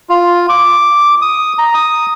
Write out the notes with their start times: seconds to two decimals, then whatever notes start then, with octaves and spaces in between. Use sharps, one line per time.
0.09 F4
0.49 D6
1.22 D#6
1.58 A#5
1.74 D#6